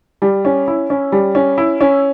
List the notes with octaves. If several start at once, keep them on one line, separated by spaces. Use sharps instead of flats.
G3
C#4
E4
C#4
G3
C#4
E4
C#4